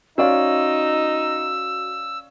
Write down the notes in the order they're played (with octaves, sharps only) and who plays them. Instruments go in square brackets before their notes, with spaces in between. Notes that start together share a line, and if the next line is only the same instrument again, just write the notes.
[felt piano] C#4 D5 F5 [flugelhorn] D#4 [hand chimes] F#4 [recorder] E6